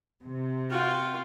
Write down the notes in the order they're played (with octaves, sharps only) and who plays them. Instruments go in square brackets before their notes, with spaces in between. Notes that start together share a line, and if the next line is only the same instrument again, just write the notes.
[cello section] C3
[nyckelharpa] F4 [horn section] F#4 G5